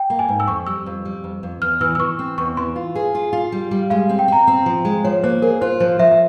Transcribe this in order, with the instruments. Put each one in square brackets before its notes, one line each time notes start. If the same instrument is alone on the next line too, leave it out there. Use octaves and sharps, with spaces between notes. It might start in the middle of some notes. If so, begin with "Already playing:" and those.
Already playing: [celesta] G5
[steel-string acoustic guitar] A#3
[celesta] G#5
[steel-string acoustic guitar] G#2
[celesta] E6
[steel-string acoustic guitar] F2 [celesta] C#6
[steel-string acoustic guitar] G3 [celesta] E6
[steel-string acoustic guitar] F2
G3
F2
F2
[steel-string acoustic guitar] E2 [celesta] F6
[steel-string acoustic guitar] E3 [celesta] E6
[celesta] E6
[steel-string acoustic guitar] E3 [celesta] C#6
[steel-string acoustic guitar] C4
[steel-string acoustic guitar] E2 [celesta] C#6
[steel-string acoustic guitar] E3 [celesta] C6
[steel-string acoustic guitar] F4
G#4
F4
F4
G3
G3
[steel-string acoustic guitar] G#3 [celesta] F5
[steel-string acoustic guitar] C4
[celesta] G5
[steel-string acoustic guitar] C4 [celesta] A#5
[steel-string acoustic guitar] C4
F3
G#3
[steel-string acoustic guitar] F3 [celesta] C#5
[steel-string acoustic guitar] A#3 [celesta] C5
[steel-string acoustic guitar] G#4 [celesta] A#4
[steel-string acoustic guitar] F4 [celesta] C5
[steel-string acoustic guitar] F3 [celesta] C5
[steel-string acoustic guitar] F3 [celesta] E5
[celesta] E5